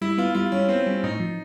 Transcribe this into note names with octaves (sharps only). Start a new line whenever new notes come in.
G3 E4
B3 F4
G3 F4
G3 C#4
B3 C4
G3 C#4
A2 D#4
F3